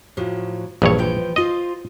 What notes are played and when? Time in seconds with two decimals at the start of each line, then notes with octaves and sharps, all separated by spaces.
0.17 A2 F3 F#3
0.82 A#1 G2 E3 C#5
0.98 E3 F3 G5
1.36 F4 C5 D#5